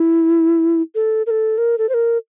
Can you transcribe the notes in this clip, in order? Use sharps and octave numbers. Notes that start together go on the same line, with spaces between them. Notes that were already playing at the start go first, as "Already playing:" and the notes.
Already playing: E4
A4
A#4
A4
A#4
A4
C5
A#4